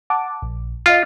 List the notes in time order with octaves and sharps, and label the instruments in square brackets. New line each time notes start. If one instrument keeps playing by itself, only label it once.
[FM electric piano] F#5 A5 D6
A#1
[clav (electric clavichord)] F4 [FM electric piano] D#5 F5 F6